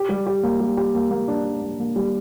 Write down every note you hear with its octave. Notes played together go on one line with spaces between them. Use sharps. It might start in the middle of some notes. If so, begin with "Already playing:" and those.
Already playing: G4
G3
G4
A#3
G3
G4
A#3
A#3
D4
D4
A#3
A#3
G3